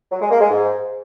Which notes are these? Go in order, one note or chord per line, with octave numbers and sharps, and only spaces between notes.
F#3
G#3
A#3
G#3
G#2